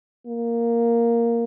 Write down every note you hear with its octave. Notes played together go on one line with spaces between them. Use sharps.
A#3